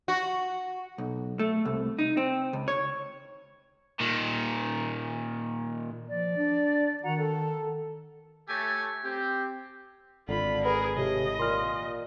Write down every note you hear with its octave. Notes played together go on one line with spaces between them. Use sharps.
F#4
B1
A3
C2
D#4
C4
C#2
C#5
A#2 D#3
F3 D5
D4
D#3 F#4 F#5 A#5
A4
A3 G4 A4 C#5 G#5
C4 G4
G#1 D3 F4 B5
G#4 A#4 B4
A2 C3 G4 D#5
A#2 C6 F6